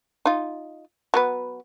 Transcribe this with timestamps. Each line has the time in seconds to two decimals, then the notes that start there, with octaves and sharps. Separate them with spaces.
0.25 D#4 F4
1.14 F#3 B3 B4